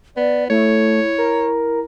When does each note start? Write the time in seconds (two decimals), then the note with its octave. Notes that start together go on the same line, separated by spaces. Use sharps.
0.17 B3 D5
0.50 A3 E4 C#5
1.18 A#4